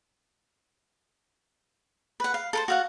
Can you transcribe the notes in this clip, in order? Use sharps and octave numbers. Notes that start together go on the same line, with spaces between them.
B4 F#5
F5
A4 A#4 C5
F#4 F5 F#5